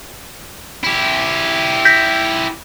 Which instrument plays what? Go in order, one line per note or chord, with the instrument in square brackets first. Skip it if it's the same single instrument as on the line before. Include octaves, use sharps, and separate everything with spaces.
[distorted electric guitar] E4 G4
[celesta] G6 A#6 B6